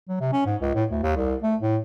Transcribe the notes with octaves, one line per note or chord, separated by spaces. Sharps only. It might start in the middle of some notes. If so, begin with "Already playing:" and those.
F#3
C3
C#4
G#2
C#2
A2
D2
D#2
C2
A3
A2